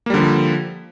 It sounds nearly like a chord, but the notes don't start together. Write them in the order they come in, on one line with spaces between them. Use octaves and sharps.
A#3 G3 D3 F3